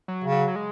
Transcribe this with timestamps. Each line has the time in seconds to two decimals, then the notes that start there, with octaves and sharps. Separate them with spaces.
0.08 F#3
0.24 C#3
0.32 F#3
0.48 F#3
0.56 G#3